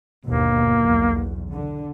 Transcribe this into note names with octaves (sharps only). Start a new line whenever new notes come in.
G1 D#2 B2 A#3
B1 E2
D3